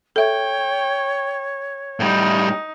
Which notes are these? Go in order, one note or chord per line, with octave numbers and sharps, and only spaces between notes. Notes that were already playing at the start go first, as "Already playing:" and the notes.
A4 C#5 E5 G5
A2 G3 D#4